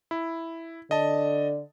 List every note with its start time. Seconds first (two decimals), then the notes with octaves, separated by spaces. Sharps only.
0.11 E4
0.91 D3 D#5 A5